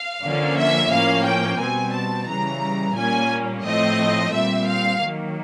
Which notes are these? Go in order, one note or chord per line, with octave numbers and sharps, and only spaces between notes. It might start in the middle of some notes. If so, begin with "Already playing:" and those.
Already playing: F5
D3 F3 A#3 C#4
E5
A2 F3 A#3 C#4 F5
G5
B2 G3 C4 G#5
A5
C#3 E3 G3 A#5
A#2 G3 A#3 C#4 G#5
A2 F3 A3 C4 D#5
A#2 G3 C4 E5
F5
D#3 F#3 A#3